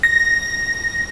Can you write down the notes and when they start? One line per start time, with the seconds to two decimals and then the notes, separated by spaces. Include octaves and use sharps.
0.03 A#6